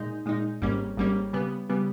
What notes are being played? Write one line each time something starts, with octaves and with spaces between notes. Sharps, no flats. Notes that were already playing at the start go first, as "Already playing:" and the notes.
Already playing: A#2 G#3 D#4
A#2 G#3 D#4
G#1 G#2 G3 A#3 C#4
G#1 G#2 G3 A#3 C#4
C#3 G3 B3
C#3 G3 B3